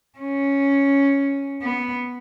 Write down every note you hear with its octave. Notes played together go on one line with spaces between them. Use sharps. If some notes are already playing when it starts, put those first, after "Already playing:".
C#4
B3